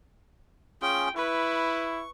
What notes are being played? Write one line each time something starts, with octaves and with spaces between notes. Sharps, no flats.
C#4 F4 G#4 G5
E4 B4 C#6